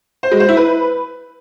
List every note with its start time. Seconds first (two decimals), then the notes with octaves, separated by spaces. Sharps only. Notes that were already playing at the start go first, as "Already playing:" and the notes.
0.23 C5
0.32 G#3
0.40 C5
0.49 E4
0.57 B4